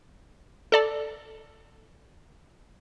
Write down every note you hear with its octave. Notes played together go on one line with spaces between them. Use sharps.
A4 D5 A5